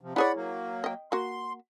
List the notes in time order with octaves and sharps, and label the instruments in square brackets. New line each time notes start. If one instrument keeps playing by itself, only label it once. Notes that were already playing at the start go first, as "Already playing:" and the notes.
[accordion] C3 F3
[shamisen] E4 G#4 C#5 [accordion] D5 F#5 B5
[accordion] F#3 A#3
[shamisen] D#5 G5
[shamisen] A#3 F#4 [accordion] C6